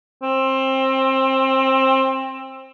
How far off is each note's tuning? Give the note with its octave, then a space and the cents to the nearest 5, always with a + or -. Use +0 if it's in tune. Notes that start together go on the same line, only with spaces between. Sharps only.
C4 +25